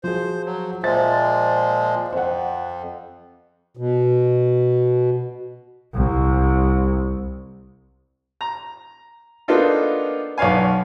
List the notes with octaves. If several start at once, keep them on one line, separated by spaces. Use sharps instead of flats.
F3 F#4 G#4 C5
F#3
A#2 F3 G#3 C5 E5 A6
F2 C5 F#5
B2
C2
A#5
A#3 B3 D4 D#4 F4 A4
B1 B4 C#5 F5 G#5